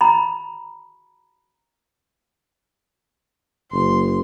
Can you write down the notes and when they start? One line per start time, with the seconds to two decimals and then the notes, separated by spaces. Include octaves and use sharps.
0.01 A#5 B5
3.72 F#1 C6